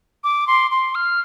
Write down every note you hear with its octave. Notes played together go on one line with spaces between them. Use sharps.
D6
C6
C6
F6